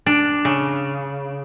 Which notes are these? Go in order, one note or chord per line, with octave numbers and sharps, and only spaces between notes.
D4
C#3